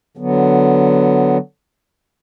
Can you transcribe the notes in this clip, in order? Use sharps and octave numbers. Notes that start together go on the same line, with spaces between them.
D3 F#3 B3